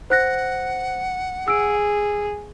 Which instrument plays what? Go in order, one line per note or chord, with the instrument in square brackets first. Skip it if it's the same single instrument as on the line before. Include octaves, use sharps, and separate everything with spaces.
[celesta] C5 F#6 A#6 [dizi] F#5
[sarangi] G#4 [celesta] E6 D7